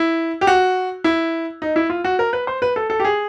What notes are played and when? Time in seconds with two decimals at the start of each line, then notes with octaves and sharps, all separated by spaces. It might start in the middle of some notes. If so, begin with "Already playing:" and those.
Already playing: E4
0.41 G4
0.47 F#4
1.04 E4
1.62 D#4
1.76 E4
1.90 F4
2.04 F#4
2.19 A#4
2.33 B4
2.47 C5
2.62 B4
2.76 A4
2.90 A4
3.00 G4
3.05 G#4